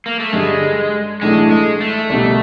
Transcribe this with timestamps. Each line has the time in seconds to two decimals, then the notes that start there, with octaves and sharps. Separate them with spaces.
0.06 A#3
0.20 A3
0.33 G2 D3 G3 G#3
1.22 B1 A2 E3 G#3 A3 D4
1.51 G#3
1.81 A3
2.10 C2 B2 G3